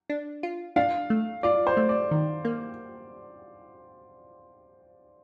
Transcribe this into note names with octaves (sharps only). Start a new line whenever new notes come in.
D4
F4
D4 F5
A3
F4 D5
C5
A3
D5
D#3
A#3